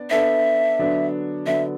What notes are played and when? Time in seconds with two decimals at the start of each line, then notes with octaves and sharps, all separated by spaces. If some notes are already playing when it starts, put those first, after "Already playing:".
Already playing: B3 D4 D5
0.10 B3 D4 A4 D5 E5
0.79 D3 F#3 B3 D4
1.46 D3 F#3 B3 D4 E5